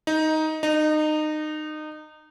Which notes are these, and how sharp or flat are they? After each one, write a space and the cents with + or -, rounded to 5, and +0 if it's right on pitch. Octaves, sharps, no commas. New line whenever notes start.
D#4 +10
D#4 -25